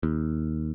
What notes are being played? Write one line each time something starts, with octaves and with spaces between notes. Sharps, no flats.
D#2